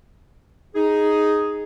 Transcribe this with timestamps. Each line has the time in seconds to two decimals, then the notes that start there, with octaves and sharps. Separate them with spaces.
0.75 D#4 G#4